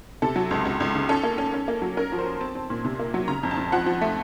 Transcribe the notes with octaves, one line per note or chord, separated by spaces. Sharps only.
C3 A4
F#3
C#2
C#2
C#2
C#3
C#4 A4
A#3
C#4
C#4
A#3
F#3
C#4 A#4
F3
C5
C#4
C4 A5
C4
A#2
C3
A#3
F#3
C#3 A#5
F2
A5
F2
F3 F#5
F3
A3